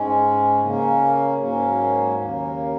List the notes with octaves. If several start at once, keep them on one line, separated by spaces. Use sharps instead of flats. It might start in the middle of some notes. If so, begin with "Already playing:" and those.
Already playing: G#2 G#3 C#4
C#3 A#3 C#4
G#2 F#3 A#3 C#4
D#2 C#3 A#3